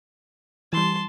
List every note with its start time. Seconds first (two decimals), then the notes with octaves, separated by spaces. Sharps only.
0.73 E3 G3 A5 C6